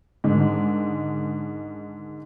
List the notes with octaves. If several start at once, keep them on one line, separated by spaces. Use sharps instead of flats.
G#2 D3 D#3